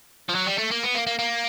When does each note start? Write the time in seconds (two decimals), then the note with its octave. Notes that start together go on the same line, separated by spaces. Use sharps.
0.29 F3
0.35 F#3
0.46 G3
0.59 A3
0.71 A#3
0.84 B3
0.95 A#3
1.07 A#3
1.19 A#3